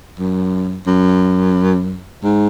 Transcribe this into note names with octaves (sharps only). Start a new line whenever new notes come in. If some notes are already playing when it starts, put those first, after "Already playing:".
F#2
F#2
G#2